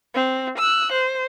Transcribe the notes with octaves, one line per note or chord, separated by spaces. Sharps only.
C4
E6 F#6
C5